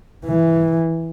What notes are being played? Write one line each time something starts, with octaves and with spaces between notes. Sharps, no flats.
E3